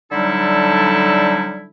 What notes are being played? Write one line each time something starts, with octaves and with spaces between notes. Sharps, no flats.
D3 F#3 G3 D#4 E4 A4